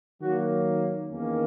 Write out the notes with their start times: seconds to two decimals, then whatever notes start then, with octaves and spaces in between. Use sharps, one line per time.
0.21 D#3 F#3 A#3 F#4
1.09 E2 D#3 A#3 C#4